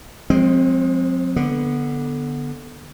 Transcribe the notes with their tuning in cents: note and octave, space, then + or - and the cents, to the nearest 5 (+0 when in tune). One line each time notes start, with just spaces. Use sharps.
F3 +40 G#3 +0 C4 +0
D3 +0 B3 -10